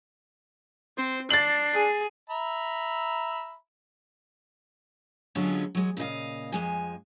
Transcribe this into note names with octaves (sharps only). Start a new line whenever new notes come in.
C4 C5
D4 A6 C7 F#7
G#4
E5 A#5 B5
D3 F#3 G#3 B3 C#4 F4
F#3 G#3
A#2 C#3 D#5 F5
F2 G#3 G#5